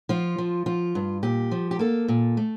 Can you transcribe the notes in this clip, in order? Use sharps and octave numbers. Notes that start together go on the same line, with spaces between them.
F3 F4
F3
F3 F4
G2
A#2 G4
F3
G4
A#3 A4
A#2
A3